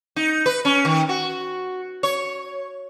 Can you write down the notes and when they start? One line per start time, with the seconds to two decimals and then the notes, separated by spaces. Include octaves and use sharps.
0.16 D#4
0.46 B4
0.65 C#4
0.85 D#3
1.09 F#4
2.03 C#5